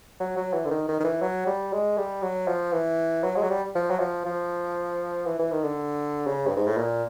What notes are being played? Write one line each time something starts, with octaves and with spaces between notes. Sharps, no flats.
F#3
F#3
E3
D3
D#3
D#3
D#3
E3
F#3
G3
G#3
G3
F#3
F3
E3
F#3
G#3
F#3
G3
F3
F#3
F3
F3
E3
E3
D#3
D3
C#3
G2
G#2
A2
A#2